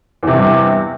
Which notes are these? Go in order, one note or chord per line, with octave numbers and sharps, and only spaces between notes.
E2 G2 C3